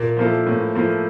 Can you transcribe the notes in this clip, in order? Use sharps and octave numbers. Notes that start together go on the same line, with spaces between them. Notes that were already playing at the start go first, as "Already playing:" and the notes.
Already playing: A#2
F3 A#3 E4 A4
A2
F3 A#3 E4 A4